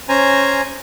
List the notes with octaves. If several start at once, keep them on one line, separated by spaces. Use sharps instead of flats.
C#4 C5 G#5 A#5